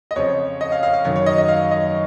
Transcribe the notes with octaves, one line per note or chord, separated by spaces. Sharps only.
D#5
F2 C#3 F3 C#5
D#5
F5
F5
F5
F#2 D#3 C#5
C#5
D#5
D#5
F5
D#5